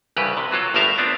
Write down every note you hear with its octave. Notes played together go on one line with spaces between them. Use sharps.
C2 G2 C#3 E3 G4 B4
C3
E3 F#3 F4 A4
G1 A2 G3 A#4 E5 F5
B3 C4 D4 F4